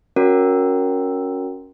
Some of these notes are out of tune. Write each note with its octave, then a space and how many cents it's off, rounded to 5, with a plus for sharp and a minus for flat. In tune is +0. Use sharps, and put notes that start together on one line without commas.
C#4 +0 F#4 -15 A#4 +0